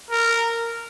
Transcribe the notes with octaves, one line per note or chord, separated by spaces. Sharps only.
A#4